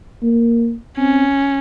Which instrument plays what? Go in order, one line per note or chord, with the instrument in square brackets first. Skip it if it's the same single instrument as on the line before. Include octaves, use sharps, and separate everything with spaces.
[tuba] A#3
[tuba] C4 [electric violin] C#4